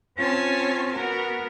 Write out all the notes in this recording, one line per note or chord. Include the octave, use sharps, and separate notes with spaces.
C4 C#4 F4 C#5 G#5 A5
B3 F#4 A#4